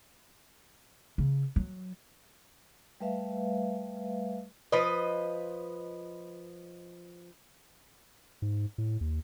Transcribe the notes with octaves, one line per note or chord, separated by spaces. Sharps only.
C#3
F#3
G3 A3 B4 E5 F5
F3 B4 D#5
G#2
A2
D#2